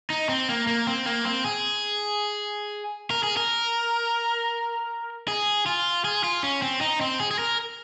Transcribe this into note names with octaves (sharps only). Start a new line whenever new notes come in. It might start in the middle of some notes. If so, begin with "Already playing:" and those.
D#4
C4
A#3
A#3
C4
A#3
C4
G#4
A#4
G#4
A#4
G#4
F4
G#4
F4
C#4
C4
D#4
C4
G#4
G#4
A#4